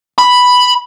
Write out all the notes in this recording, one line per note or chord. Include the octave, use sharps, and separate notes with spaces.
B5